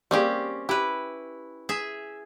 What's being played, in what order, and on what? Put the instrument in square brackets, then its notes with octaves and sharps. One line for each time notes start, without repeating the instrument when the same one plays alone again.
[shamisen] G3 A#3 G#4 [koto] C4 C#4 G4
[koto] E4 B4 [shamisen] G4
[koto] G#4 E5